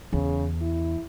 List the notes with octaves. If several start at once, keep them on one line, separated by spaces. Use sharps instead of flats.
E2 C#3
E4